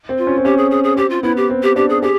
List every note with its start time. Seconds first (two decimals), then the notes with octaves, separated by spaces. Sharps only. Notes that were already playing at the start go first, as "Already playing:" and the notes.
0.09 C4
0.18 F4
0.27 C#4
0.38 C4
0.45 C#4 G4
0.58 G#4
0.71 G#4
0.84 G#4
0.97 C4 G4
1.10 F4
1.23 B3 E4
1.37 G4
1.50 C4
1.63 G4
1.76 D4 G4
1.89 G#4
2.02 G4 G#4